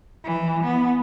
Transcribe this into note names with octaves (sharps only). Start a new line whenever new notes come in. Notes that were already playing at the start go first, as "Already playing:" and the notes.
E3
B3